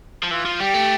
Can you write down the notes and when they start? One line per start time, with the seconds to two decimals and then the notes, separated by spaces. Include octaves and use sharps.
0.23 F3
0.31 E3 F4
0.45 F3
0.60 G3 G4
0.74 A3